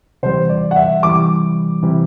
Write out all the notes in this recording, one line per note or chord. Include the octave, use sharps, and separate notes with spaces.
C3 E3 G3 C5
D5
F#5
E5
C3 E3 G3 D6
C3 E3 G3